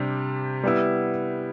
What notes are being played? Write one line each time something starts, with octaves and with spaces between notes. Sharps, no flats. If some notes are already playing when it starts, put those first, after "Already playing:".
Already playing: C3 G3 D4
G3 B3 E4